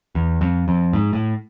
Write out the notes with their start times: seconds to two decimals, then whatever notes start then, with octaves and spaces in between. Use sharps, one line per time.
0.15 E2
0.41 F2
0.68 F2
0.93 G#2
1.13 A2